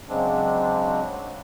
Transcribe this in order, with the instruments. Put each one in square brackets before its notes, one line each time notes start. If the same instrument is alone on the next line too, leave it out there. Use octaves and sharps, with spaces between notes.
[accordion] C#3 F#3 G#3 C4 D4